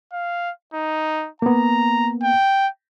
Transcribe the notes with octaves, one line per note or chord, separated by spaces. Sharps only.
F5
D#4
A#3 B3 A#5
G5